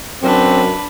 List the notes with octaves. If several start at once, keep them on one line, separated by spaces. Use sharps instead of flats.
F#2 C4 D4 B4